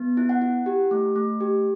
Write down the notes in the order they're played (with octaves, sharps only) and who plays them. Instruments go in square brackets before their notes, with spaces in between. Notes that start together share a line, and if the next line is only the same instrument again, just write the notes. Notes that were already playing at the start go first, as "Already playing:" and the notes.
Already playing: [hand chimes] B3
E4
F#5
E4
G4
A3
A3
G4